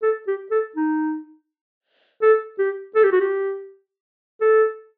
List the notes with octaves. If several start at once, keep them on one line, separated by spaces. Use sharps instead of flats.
A4
G4
A4
D#4
A4
G4
A4
G4
F#4
G4
A4